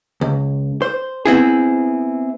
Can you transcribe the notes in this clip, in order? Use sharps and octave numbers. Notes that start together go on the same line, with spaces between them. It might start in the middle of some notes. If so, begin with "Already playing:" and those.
C#2
C5
B3 C4 E4 G#4